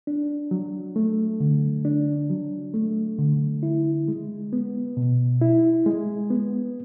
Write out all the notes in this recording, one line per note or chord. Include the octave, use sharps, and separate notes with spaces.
D4
F#3
A3
D3
D4
F#3
A3
D3
E4
G#3
B3
B2
E4
G#3
B3